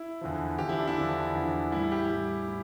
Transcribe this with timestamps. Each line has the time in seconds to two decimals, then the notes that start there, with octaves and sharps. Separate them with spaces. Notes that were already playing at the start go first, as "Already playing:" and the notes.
Already playing: E4
0.21 E2 D3 F3
0.58 E2 D3 F3 G4
0.69 E4
0.78 D4
0.87 E4
0.96 E2 D3 F3
1.35 E2 D3 F3
1.72 A2 G3 E4
1.92 G4
2.11 A2 G3
2.48 A2